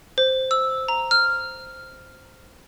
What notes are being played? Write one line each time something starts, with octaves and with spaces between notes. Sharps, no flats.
C5
E6
A#5
F6